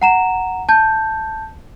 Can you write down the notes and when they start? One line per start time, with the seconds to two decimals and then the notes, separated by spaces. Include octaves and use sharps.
0.02 F#5 A#5 E7
0.69 A5 G6